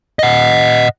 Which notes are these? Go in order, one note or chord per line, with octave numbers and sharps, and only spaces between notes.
D#5 F#5